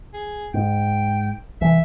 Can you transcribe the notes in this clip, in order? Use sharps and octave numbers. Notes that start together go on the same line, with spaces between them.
G#4
G#2 G5
C2 E3 E5